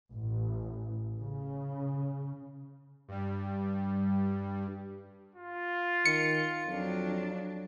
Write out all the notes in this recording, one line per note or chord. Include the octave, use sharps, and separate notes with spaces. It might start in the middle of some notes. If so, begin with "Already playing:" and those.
A1
C#3
G2 G3
F4
D#3 C#7
F2 F#3 D4